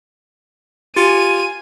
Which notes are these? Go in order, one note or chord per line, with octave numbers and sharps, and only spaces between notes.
F4 G4 G#5 D#7